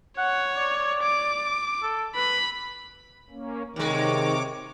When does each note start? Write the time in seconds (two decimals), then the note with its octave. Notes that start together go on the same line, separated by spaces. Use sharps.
0.18 C#5 F#5
0.57 D5
1.03 D6
1.83 A4
2.16 B4 B5
3.30 A#3 C#4
3.76 D#2 C3 D#3 G#3 C#5 D6